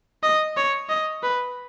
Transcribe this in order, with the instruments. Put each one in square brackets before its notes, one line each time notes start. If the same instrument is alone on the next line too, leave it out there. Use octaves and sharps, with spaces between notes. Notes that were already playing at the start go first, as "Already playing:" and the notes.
[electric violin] D#5
C#5
D#5
B4